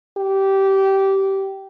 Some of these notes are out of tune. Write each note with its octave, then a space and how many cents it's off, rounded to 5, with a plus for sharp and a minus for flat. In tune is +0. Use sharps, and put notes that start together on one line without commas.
G4 -15